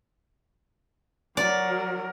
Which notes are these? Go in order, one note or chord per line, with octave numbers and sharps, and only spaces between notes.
F#3 A#4 D5